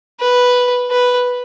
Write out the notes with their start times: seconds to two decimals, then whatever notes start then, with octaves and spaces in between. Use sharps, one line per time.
0.20 B4
0.91 B4